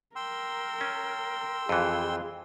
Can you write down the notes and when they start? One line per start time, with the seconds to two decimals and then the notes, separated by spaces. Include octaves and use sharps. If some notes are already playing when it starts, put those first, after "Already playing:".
0.16 A#4 G5 C6 E6
0.81 C#4
1.69 F2 E3 F4 G#4